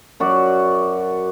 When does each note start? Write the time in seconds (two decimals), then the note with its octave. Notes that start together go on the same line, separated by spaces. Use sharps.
0.20 F#2 F#4 D5